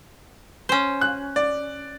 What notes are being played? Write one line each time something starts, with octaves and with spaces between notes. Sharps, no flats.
C#4 C5
F#6
D5